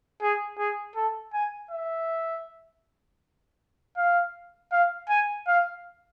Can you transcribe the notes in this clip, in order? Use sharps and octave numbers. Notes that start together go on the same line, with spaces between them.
G#4
G#4
A4
G#5
E5
F5
F5
G#5
F5